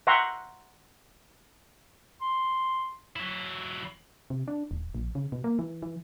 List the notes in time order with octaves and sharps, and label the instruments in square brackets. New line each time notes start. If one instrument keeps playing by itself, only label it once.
[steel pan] E5 F#5 G5 A#5 C6 C#6
[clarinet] C6
[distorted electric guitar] F#3 E4
[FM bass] C3
D4
D#1
A#1
C#3
B2
A#3
E3
E3